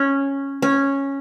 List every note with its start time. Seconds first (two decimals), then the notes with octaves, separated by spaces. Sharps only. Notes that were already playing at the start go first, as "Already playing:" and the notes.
Already playing: C#4
0.62 C#4